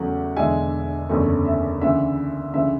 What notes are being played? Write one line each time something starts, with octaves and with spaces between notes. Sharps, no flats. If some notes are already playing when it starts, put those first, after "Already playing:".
Already playing: E2 C#3 F#3 A3 F#5
E1 E2 D3 G#3 E5 G#5
F#1 E2 D3 A3 C#4
E5
D2 C#3 E3 E5
D2 C#3 E3 E5